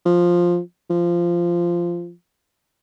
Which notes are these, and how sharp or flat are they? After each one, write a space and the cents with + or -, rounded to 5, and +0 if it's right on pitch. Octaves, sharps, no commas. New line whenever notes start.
F3 +5
F3 -10